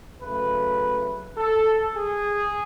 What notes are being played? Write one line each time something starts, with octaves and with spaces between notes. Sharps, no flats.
C#3 F#3 A3 B4
A4
G#4